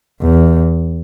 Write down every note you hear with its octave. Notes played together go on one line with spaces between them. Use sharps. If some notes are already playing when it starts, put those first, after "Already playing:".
E2